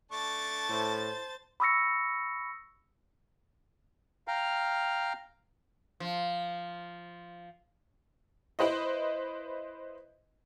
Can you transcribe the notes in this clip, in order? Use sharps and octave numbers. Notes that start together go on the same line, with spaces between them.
A3 D4 A5 C#6 A6
A2 C5
B5 C#6 D#6 E6 A#6 C#7
F5 G5 A#5 F6
F3
E4 B4 C5 D#5